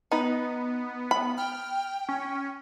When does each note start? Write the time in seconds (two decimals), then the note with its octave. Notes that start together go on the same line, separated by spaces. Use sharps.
0.11 B3 D#4 B4
1.11 B5
1.38 G5 F6
2.09 C#4